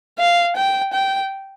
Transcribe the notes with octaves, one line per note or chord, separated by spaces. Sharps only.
F5
G5
G5